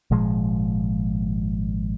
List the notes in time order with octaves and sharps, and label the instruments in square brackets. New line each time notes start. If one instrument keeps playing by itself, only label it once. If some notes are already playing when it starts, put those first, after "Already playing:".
[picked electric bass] G#1 A#2 F3 G#3